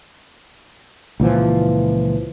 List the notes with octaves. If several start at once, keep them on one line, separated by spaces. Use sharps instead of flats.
C#2 A#2 E3 F3